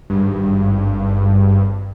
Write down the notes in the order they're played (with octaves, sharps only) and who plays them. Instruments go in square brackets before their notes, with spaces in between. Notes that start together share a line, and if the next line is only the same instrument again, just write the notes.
[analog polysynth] G#1 G2